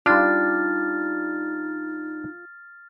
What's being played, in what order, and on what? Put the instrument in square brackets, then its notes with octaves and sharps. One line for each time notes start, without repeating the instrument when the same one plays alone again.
[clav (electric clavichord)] G3 D4 [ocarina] D#4 [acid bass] F4 [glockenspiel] F6 A6